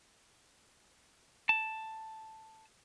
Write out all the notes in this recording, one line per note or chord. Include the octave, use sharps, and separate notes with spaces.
A5